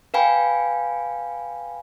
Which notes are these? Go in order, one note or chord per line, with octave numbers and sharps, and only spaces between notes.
B4 F5 G5 G#5 B5